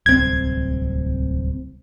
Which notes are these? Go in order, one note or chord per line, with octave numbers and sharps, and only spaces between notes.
D1 C2 C4 G#6